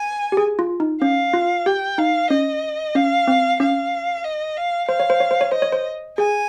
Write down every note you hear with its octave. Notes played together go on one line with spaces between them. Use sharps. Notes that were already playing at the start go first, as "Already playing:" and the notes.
Already playing: G#5
G4
G#4
F4
D#4
C#4 F5
F4
G4 G5
D#4 F5
C#4 D#5
C#4 F5
C4
C#4 F5
D#5
F5
C5 F5
C#5
C5
C#5
C5
C#5
C5 D#5
C#5
C5
G#4 G#5